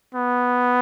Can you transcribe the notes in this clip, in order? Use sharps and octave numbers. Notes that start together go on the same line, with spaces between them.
B3